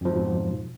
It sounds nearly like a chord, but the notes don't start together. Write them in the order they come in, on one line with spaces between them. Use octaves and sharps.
F2 F3 G#2 B2